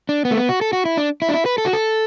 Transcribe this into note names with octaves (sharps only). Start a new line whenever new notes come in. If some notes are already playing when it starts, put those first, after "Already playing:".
D4
B3
A3
B3
F#4
A4
F#4
E4
D4
E4
D4
E4
B4
A4
F#4
A4